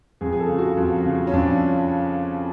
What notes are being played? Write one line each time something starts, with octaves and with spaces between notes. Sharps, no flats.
F2 G#4
G#4
A4
C#3
F#4
F2
C#3
C#4
F2 D4